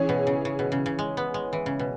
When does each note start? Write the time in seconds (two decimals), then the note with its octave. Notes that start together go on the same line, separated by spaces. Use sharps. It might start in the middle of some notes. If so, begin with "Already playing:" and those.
Already playing: E3 C#4 G#4 C#5
0.09 B2
0.27 C#3
0.45 C#3
0.59 B2
0.72 C#3
0.86 C#3
0.99 G#3
1.17 B3
1.34 G#3
1.53 E3
1.66 C#3
1.79 B2